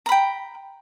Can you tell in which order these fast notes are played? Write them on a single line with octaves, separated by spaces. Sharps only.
A#5 B5 G5